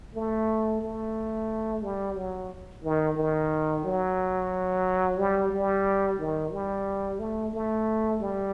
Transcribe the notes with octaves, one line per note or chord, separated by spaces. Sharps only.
A3
A3
G3
F#3
D#3
D#3
F#3
G3
G3
D#3
G3
A3
A3
G3